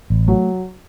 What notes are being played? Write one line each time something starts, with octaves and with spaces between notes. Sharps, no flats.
A1
F#3 A3